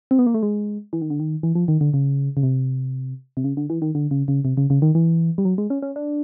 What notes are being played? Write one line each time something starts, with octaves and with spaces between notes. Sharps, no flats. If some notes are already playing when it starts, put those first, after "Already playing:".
C4
B3
A#3
A3
G#3
E3
D#3
D3
D#3
E3
F3
D#3
D3
C#3
C#3
C3
C3
C#3
D3
E3
D#3
D3
C#3
C#3
C3
C#3
C#3
D#3
E3
G3
F#3
G#3
C#4
C#4
D4